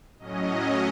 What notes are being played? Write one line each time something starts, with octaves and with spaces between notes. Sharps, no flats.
A2 F#3 C#4 D#5